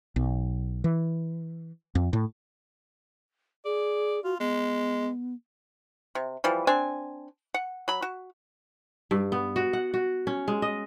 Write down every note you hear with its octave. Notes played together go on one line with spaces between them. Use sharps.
B1
E3
F2
A2
G#4 D5
F4 F#4
G#3 B3
C3
E3 F3 G3
C4 D4 G#5
F#5
F#3 B5
F#4
G2
B3
F#4
F#5
F#4
C#4
G#3
D#5